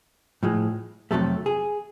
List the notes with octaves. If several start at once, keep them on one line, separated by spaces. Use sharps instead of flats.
A2 F3 G#3
F2 C3 D#3 F#3 A3 A4
G#4